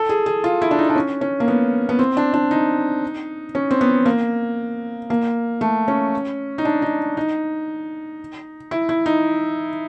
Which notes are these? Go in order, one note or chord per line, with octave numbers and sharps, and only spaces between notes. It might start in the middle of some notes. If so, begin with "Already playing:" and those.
Already playing: A4
G#4
G#4
F4
E4
D4
D#4
D4
C#4
C#4
A#3
B3
B3
C4
D4
D4
D#4
C#4
C4
B3
A#3
A#3
A3
C#4
D#4
D4
D#4
D#4
E4
E4
D#4